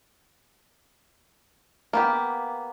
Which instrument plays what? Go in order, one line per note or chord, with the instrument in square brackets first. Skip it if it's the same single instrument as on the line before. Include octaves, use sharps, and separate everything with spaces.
[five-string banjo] A#3 B3 G4